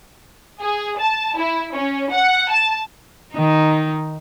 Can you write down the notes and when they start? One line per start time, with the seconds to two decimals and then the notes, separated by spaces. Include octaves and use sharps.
0.61 G#4
0.99 A5
1.38 E4
1.73 C#4
2.11 F#5
2.50 A5
3.34 D#3 D#4